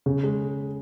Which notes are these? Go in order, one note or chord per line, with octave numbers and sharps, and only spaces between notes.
C#3
G#3